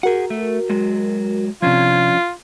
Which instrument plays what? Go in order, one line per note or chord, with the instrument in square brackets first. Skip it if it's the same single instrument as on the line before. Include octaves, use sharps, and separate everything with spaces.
[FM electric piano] F#4 A#4 [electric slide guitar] G#4 F#5
[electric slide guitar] A3
F#3 G#3
[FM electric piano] C3 G#6 [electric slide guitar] F3 C#4 D4 [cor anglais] F4